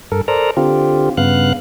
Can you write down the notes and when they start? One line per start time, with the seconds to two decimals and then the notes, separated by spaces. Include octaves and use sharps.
0.12 G2 A4 A#4
0.28 A4 A#4 C5 D5 A#5
0.57 D3 C4 F4 G4
1.17 G2 C#3 B3 F5 F#6